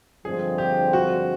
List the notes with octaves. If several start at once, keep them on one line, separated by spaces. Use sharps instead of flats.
G2 D3 F3 G#3 C4 G#4
G4
F#4